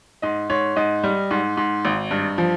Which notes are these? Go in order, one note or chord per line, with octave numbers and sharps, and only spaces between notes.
G#2 D#5
G#2 C#5
G#2 D#5
G3
G#2
G#2
G#1
G2
F3